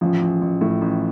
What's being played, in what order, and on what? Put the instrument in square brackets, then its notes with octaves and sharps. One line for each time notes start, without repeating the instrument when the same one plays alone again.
[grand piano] A1 [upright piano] F3
[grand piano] A1
A1
A2
A1